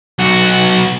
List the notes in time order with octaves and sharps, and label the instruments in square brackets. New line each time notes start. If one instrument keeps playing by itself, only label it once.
[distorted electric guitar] B1 F#4